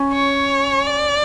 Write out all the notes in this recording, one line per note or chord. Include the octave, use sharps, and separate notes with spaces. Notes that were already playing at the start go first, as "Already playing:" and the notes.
Already playing: C#4
C#5
D5